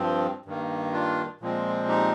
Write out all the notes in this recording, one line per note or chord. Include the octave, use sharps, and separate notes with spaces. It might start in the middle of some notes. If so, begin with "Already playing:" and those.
Already playing: G2 F3 C4
G2 D#3 A#3
D4 F4
A#2 F3 G#3 C4
D#4 G4